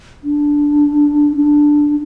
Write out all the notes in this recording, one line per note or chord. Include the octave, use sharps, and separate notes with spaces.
D4
D4